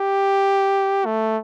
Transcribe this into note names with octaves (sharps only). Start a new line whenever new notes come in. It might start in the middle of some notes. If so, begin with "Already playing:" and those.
Already playing: G4
A3